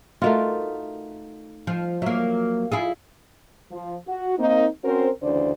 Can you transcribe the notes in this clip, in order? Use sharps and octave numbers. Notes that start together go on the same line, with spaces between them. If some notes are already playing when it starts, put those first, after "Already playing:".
A3 D#4 F4 F#4 A#4
F3
F#3 A#3 E5
E4 F4 G#4
F3
F#4
A#3 C4 D#4
C4 C#4 F#4 A#4 C5
D2 C#3 E3 D4 C5 D5